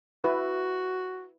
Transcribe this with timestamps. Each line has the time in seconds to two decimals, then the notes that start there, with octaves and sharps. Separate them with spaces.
0.24 E4 F#4 B4